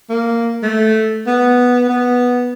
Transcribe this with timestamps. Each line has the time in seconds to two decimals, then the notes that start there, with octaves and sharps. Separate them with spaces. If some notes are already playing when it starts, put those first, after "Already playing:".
0.09 A#3
0.63 A3
1.27 B3
1.89 B3